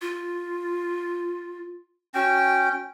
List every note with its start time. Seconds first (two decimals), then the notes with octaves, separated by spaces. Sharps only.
0.02 F4
2.14 C#4 F#4 G5